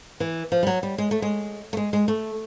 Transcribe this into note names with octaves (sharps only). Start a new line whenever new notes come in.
E3
F3
G3
F#3
G3
G#3
A3
G#3
A3
G#3
G#3
A3